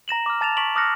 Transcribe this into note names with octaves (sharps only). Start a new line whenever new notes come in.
A#5 A#6 E7 F#7
D6 F6
A5 A6 E7 F7
C#6 B6 D7 F#7
D6 D#6 F6 F#6 A#6 C#7